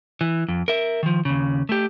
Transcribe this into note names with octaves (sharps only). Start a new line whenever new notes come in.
E3
F2
A#4 E5
D#3 F3
D#2 C#3
A3 G4